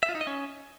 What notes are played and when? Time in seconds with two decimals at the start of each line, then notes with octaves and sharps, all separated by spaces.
0.03 E5
0.09 F4
0.15 D#4
0.21 D#5
0.27 C#4